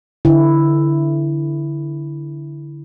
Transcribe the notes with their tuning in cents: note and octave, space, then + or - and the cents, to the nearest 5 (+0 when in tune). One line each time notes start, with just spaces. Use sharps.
D3 -15 E4 +0